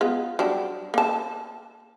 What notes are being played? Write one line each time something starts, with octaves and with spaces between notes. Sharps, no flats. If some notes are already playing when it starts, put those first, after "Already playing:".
G#3 B3 F4
F#3 G3 D4
A#3 A5